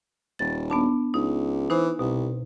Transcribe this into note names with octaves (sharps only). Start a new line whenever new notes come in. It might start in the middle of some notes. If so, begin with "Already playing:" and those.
D#1 A6
B3 D4 A5
C#2 D#4
E3 D#4 C5
C2 B2